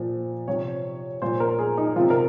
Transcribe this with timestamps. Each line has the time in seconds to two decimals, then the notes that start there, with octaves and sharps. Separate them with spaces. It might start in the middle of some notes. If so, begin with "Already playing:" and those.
Already playing: A#2 F3
0.48 C3 F3 C#5
1.22 A#2 F3 C5
1.40 A#4
1.59 G#4
1.77 D#4
1.96 C3 F3 F4
2.10 A#4